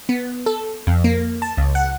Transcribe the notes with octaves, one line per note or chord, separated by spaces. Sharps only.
B3
A4
F2
A#3
A5
C#2
F#5